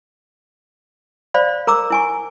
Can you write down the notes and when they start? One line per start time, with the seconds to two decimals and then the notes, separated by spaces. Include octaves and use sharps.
1.34 C5 D5 F5 B5
1.67 A#4 A#5 D6 E6
1.90 E4 G#5 C#6